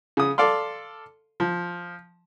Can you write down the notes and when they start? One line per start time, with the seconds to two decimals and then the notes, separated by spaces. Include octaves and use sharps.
0.17 C#3 D#6
0.38 A4 D5 F5 C6
1.40 F3